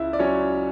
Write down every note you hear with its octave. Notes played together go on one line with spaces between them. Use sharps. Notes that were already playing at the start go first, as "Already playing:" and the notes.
Already playing: C#2 E4 E5
D5
F#3 C#4 C#5